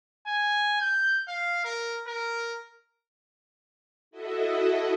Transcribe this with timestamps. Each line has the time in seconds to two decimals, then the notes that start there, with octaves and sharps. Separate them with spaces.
0.27 G#5
0.81 G6
1.27 F5
1.65 A#4
2.07 A#4
4.11 E4 F#4 A4 D#5 E5